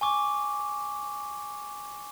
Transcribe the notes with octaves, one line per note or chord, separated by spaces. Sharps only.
G#5 C#6 D6